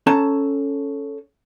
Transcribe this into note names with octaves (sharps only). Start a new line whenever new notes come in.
C#4 A4 A5 A#5